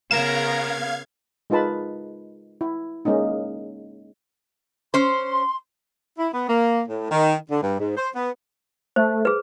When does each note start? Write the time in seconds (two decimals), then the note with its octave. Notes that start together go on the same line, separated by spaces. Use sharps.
0.11 C#3 B3 A#4 F5 A#5 G#6 E7
1.50 G#3 D#4 F4 B4 A5 B5
2.61 E4
3.05 G#3 A#3 C#4 D#4
4.94 C#4 C5 C6
6.18 E4
6.33 B3
6.49 A#3
6.88 A2
7.11 D#3
7.50 D3
7.62 G2
7.80 G#2
7.97 C5
8.15 B3
8.96 A3 C5
9.25 G#4 B4